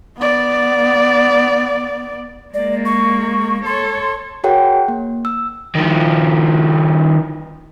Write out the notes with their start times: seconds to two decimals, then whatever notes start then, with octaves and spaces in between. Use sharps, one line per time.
0.17 B3 D5
2.54 G#3 A#3 D5
2.85 C#6
3.65 A4 C#5 C6
4.44 F#4 G#4 A#4 C#5 F#5 G5
4.88 A#3
5.25 E6
5.75 D#3 F3